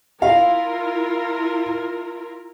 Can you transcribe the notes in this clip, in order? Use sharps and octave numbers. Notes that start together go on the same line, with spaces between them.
E4 F4 A#4 F5